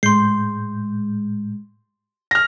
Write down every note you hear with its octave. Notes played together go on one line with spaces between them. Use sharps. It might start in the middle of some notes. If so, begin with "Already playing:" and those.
A2 G#3 C6 G6 C7
F6 A#6